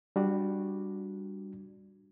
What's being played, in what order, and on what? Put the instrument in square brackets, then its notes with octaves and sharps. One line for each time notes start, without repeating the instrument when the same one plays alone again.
[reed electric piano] G3 D4 F#4